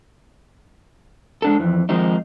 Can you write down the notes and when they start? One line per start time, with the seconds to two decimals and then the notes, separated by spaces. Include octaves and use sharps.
1.42 G#3 D4 A4
1.60 F2 E3
1.89 D#3 F3 G#3 C4 D#4